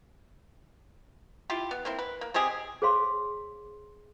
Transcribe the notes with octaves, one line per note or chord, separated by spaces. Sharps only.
E4 F4 G4
B3
A#3 C4 E4
B4
A#3
G#3 C4 G4 G#4
G#4 C5 C#5 F5 C6